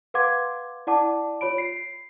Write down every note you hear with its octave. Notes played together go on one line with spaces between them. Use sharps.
B4 F5 F#5 C6 D6 G#6
E4 D5 F#5 A5 D6
F4 C#5 B5 D7
C7